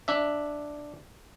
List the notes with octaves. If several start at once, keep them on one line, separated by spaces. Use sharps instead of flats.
D4 E5